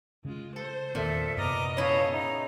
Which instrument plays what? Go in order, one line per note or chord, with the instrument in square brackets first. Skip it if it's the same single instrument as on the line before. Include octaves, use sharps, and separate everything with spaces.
[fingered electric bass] C#3 C#4 [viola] G#3 F4
[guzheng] A4 [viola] C5
[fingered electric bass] E2 D#3 C4 [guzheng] A#2 [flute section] A4 E5
[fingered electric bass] F#2 C3 [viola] B3 D#5 [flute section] A#5 D6 F6
[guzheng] C#3 E4 [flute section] C#5 F5 A5
[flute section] D#4